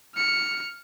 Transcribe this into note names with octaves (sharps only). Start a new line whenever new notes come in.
F6 C#7